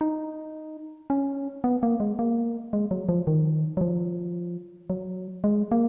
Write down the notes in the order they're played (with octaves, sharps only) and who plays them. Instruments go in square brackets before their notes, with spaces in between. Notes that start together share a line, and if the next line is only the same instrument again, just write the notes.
[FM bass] D#4
C#4
B3
A#3
G#3
A#3
G#3
F#3
F3
D#3
F#3
F3
F#3
G#3
A#3